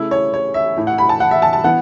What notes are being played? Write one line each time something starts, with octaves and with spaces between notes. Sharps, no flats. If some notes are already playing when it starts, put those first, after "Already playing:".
Already playing: C#3 A3 E4
C#5
C#5
E5
A2 A3 E4
F#5
B5
A5
F#5
E5
A5
A5
E3 B3 F#5